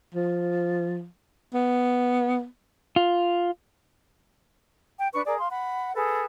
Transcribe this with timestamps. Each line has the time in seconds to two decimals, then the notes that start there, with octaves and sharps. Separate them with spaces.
0.14 F3
1.54 B3
2.96 F4
4.99 G5
5.13 D4 B4 C#6
5.25 G#4 A#4 D5
5.39 F5 C6
5.51 F#5 B5
5.94 G#4 A4 B4